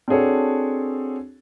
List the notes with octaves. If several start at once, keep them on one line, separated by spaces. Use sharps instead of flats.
C4 D4 F#4 G#4 A4 C#5